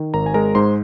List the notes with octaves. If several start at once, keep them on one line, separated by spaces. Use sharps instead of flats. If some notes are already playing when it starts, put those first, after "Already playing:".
Already playing: D#3
G#1 A#4 A#5
G#5
G#3 A#4 A#5
G#2 C5 C6